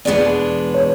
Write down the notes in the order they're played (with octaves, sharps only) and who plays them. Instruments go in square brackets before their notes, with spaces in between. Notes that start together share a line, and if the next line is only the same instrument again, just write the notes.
[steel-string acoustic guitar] E2 B2 G#3 B3 D4 [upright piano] D5
[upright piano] C#5